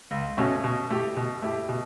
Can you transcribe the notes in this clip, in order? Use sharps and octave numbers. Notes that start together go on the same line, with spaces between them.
C#2
B2 A3 C#4 F#4
B2
A3 E4 G4
B2
A3 E4 G4
B2